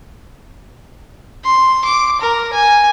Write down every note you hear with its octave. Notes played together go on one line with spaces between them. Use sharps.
C6
D6
A#4
G#5